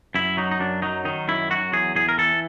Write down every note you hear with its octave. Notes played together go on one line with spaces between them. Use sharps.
F#2 E4
F#3 D#4
D#4
F#2 D4
F#3 D#4
D#3 D#4
F#2 E4
F#3 F#4
E2 G#4
E2 G#4
A#4
E3 A4